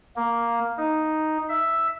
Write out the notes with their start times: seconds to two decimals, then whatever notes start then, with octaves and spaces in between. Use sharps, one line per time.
0.16 A#3
0.77 D#4
1.49 E5